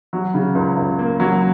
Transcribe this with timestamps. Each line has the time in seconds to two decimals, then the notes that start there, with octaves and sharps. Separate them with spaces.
0.13 F#3
0.34 C#3
0.55 C#2
0.77 C#2
0.99 A#3
1.20 F#3